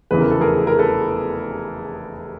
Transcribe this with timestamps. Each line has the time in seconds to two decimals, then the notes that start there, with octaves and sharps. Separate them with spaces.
0.11 F1 E2 C#3 E3 B4
0.21 A#4
0.30 A4
0.41 G#4 A#4
0.67 A#4
0.78 A4 B4